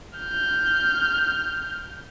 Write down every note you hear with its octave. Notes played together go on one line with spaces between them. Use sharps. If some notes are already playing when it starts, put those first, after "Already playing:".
F6 G6